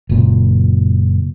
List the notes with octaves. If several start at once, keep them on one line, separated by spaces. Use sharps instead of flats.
F#1 A#2